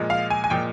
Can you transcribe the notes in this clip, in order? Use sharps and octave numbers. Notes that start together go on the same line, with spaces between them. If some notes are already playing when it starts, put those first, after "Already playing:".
Already playing: A#2 F3 G#3
F5
G#5
G#5
A#2 F3 G#3 G5